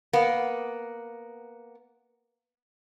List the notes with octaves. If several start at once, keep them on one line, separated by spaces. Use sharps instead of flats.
A#3 B3